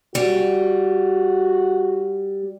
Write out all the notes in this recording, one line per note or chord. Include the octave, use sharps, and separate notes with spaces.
G3 F#4